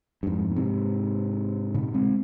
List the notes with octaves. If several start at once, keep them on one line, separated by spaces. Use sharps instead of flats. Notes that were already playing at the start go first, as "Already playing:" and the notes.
G2
F2 G#2
A#2
G#2 C3
A#2 C#3
G#3 C4